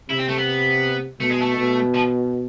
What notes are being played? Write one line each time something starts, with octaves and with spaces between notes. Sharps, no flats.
C3 E4
C4
A3
B3
B2 A3
G#3
A3
B2
F3